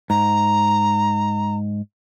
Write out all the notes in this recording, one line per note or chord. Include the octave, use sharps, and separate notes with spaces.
G#2 A#5